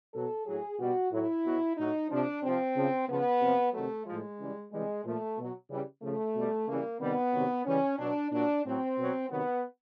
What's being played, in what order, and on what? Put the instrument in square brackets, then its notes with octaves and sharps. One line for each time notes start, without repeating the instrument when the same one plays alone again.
[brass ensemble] B2 F#3 A4
A2 F#3 G#4
B2 G3 F#4
A2 F#3 E4
B2 F#3
A2 F#3 D#4
C3 F3 D4
C3 F3 C4
C#3 F3
C#3 F3 B3
C3 F3
C3 D#3 F#3 A3
A2 F3 G#3
C#3 E3 G3
C3 E3 G3 G#3
A#2 F3 A3
B2 F#3
C#3 E3 G3
C#3 F3 A3
B2 G3
C#3 E3 G3 A#3
C3 D#3 G3 B3
C3 D#3 F#3
C#3 E3 G3 C#4
B2 F#3 D4
A#2 F#3 D4
A2 F#3 C4
B2 F#3
C3 D#3 F#3 B3